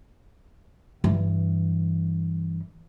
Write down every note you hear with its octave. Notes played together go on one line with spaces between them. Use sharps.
G2 E3